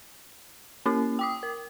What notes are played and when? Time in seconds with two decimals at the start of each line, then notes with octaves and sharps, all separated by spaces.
0.86 A#3 C#4 E4
1.19 G5 D6 D#6
1.43 A#4